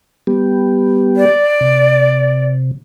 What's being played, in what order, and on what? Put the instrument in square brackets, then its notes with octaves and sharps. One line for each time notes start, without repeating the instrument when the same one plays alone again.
[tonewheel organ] G3 B3 G4
[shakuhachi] D5
[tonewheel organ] C3